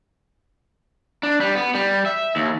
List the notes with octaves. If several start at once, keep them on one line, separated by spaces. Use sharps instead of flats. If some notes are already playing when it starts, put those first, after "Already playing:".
D4
G3
B3
G3
E5
D#2